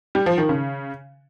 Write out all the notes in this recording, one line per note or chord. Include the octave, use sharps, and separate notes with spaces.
G3
F3
D#3
C#3